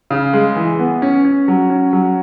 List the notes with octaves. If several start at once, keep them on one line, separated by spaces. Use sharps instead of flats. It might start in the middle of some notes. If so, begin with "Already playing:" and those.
C#3
G#3
E3
B3
C#4
C#4
F#3
C#4
F#3